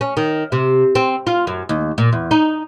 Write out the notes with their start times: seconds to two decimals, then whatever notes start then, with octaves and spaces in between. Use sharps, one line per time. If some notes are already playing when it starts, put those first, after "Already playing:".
0.01 C#4
0.17 D#3
0.52 C3
0.95 C4
1.27 F4
1.47 F#2
1.69 D#2
1.98 A#2
2.13 E2
2.31 D#4